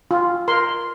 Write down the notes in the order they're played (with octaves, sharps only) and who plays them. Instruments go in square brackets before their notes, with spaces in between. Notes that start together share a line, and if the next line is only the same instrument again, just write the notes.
[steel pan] F4
A#4 C6